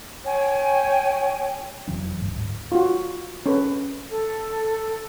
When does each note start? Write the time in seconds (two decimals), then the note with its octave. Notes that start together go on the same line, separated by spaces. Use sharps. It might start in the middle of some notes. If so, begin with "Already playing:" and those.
0.25 C#5 G5 G#5
1.88 F1 E3 F#3 D4
2.21 D1 G#2
2.72 F4 F#4
3.46 C#4 A4 B4
4.10 A4